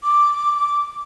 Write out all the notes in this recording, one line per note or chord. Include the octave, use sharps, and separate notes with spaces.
D6